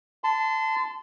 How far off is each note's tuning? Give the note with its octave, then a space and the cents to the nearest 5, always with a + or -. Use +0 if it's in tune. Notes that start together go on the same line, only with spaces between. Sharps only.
A5 +0 C6 -30